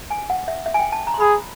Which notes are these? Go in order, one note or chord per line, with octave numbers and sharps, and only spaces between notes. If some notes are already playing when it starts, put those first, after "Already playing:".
G#5
F#5
E5
E5
G#5
G5
A5
A#5
C6
G#4 B5